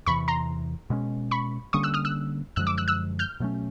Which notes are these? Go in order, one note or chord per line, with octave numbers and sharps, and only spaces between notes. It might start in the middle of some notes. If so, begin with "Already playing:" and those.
E2 C3 E3 B5 C#6
A#5 C6
B2 G#3 C#4
B5 C#6
D3 G3 A#3 C#4 C#6 D#6
E6 F#6
D#6 F6
E6 F#6
F#2 D3 F3 G#3 E6 F#6
D6 E6
E6 F#6
E6 F#6
F6 G6
B2 F#3 A3 C#4